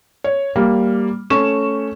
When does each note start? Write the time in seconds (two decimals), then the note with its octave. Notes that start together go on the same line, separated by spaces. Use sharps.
0.24 C#5
0.56 G3 A#3
1.30 A3 C#4 C#6 E7